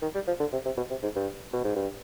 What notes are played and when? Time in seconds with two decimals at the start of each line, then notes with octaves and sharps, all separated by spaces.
0.02 D#3
0.15 G3
0.27 F3
0.40 D3
0.52 C3
0.65 C3
0.77 B2
0.90 C3
1.03 G#2
1.16 G2
1.53 B2
1.64 G#2
1.75 G2